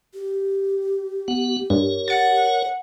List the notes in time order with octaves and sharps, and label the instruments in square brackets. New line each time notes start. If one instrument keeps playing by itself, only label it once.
[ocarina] G4
[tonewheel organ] B3 F#5
[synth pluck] G2 [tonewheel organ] A#4 C#5
[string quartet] F#5 [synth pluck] A6 C#7